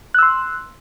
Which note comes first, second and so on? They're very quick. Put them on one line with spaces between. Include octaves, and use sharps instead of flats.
F#6 E6 C6